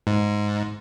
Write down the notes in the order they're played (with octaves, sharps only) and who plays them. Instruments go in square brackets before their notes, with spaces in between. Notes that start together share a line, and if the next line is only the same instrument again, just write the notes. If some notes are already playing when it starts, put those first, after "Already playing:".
[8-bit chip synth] G#2